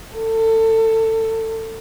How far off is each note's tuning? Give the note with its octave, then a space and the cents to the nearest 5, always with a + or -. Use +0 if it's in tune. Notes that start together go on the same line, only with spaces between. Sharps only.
A4 +25